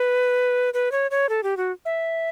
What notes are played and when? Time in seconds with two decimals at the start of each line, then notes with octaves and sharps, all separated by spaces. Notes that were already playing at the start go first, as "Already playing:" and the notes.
Already playing: B4
0.74 B4
0.92 C#5
1.11 C#5
1.29 A4
1.43 G4
1.57 F#4
1.85 E5